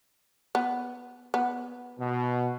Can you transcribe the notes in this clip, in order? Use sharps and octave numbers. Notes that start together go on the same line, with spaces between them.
B3
B3
B2